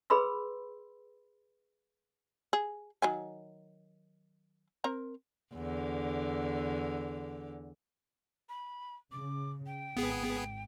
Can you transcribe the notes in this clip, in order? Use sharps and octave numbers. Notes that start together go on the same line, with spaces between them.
G#4 B4 B5 C6 E6
G#4
D#3 F#3 G#5
C4 A#4 A#5
E2 D3
B5
C#3 D6
G5
G#1 B3 G#4